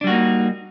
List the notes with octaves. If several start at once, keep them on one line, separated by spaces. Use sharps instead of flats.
G3 A#3 D4 D#4 F#4